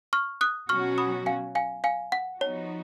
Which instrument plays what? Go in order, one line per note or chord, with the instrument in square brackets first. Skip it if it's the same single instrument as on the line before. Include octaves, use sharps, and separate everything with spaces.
[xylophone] C#6 F6
D#6 F#6
[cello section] B2 F#3 C#4 F#4 [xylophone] C#6 F6
[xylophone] B5 D#6
F5 G#5
F5 G#5
F5 G#5
F#5
[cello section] F3 B3 D#4 F#4 [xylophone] C#5